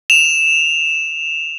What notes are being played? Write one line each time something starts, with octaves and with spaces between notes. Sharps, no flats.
E7 F7